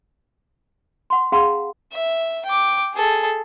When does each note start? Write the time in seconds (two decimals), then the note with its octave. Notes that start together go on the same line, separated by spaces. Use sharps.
1.10 F#5 C6
1.32 C#4 G#4 F5 F#5 A#5 C6
1.93 E5
2.46 G5 D6
2.94 G#4 A4